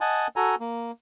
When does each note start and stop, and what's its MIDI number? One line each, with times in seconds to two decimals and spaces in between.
0.01 0.27 75
0.01 0.27 78
0.01 0.27 80
0.01 0.27 81
0.36 0.55 66
0.36 0.55 69
0.36 0.55 80
0.36 0.55 82
0.60 0.91 58